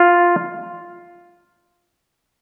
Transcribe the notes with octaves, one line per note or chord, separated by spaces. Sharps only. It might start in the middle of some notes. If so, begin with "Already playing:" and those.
Already playing: F4